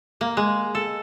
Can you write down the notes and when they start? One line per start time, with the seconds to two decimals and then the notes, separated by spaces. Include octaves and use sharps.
0.21 A#3
0.37 G#3
0.75 A4